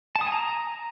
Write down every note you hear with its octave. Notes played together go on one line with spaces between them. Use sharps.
A5
D#6
G#5
A#5